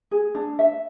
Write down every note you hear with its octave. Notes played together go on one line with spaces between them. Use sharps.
G#4
D4
E5